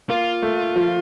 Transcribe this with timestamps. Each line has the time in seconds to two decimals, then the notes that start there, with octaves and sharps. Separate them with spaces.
0.09 A#3 F4
0.42 A3
0.76 F3